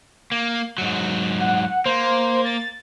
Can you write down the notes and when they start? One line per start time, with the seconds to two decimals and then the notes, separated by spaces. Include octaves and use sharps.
0.32 A#3
0.78 G#2 F#3
1.41 F#5
1.86 A#3 C5
2.45 A6